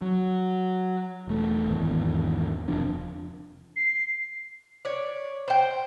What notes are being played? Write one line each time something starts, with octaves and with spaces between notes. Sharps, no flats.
F#3
E1 A3
G#1 E2
F1 F3 C4 D4
C7
C#5 D5
C5 G5